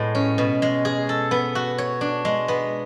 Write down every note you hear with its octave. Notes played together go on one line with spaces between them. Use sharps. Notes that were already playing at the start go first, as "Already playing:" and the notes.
Already playing: A2 G#3 B3
C#4
B2
G#3
G#4
A4
B3
F#4
C#5
D4
G#3
B3